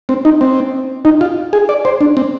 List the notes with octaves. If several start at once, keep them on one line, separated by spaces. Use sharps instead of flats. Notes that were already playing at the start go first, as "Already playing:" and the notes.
C4
D#4
C4
D#4
F4
G#4
D5
C5
D4
C4